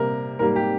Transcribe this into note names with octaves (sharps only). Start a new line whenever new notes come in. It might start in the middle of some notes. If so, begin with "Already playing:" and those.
Already playing: C3 G3 A#3 A#4
G#2 G3 A#3 A#4
G4